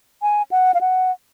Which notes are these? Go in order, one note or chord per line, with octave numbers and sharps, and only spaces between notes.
G#5
F#5
F5
F#5